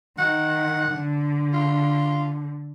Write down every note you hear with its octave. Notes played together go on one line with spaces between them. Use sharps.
D#3 F#5
D3
F4